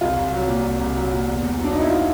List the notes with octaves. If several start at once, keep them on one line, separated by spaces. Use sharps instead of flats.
C2 F4
C2
F#3
A#2
C2
C2
F#3
A#2
E2
E2
F#3 D4
B2 D#4
E4
F4